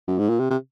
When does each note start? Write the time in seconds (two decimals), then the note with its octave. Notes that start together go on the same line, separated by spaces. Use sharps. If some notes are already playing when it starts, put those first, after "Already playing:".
0.08 F#2
0.19 G#2
0.30 A#2
0.40 C3
0.51 C3